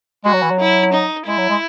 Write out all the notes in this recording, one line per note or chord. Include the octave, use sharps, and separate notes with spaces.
G#3 F#4
F#3
E3
F#3
E4
D#4
G#3 E4
F#3
G#3